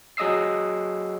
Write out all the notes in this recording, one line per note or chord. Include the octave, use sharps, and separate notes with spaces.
F#3 G#4 D#5 D#6 E6 C7